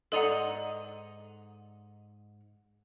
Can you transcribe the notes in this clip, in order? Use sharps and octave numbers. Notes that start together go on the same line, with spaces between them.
G#2 A4 D5 D#5 F#5 A#5